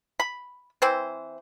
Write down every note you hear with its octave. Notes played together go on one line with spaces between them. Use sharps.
B5
E3 C4 C5